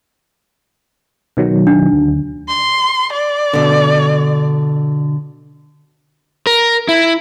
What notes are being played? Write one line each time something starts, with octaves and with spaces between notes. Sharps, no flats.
B2 D#3 F#3
D4
D2
C6
D5
B2 D3
A#4
E4